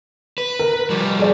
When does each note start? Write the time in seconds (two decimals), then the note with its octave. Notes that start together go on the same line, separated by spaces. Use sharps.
0.38 B4
0.59 A#4
0.90 F3 G3
1.19 G#4 D5